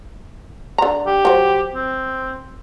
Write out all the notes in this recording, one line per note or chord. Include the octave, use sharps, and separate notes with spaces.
D3 A#5
G4
F#3 C5
C4